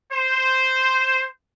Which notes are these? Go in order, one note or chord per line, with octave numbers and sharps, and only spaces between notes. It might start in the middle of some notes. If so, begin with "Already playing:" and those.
C5